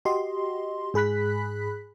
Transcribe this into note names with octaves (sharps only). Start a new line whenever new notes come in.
F#4 G4 D#5 C6
G#2 G#4 B5 F#6 B6